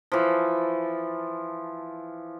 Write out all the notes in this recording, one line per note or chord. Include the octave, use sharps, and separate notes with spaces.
E3 F3